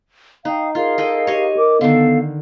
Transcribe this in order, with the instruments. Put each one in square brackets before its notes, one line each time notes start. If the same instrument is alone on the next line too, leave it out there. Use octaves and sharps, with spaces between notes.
[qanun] D#4 [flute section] F5 G5 D#6
[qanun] F4 [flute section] G#4 A#4 F5
[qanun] A4 D#5 G5
[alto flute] G4 [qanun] C#5 D#5
[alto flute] A#4 [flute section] D6
[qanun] D3 D#3 [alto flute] B3 [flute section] A4 F5